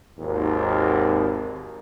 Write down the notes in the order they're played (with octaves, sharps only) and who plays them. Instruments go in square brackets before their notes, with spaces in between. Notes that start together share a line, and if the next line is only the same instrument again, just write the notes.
[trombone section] G#1 D#2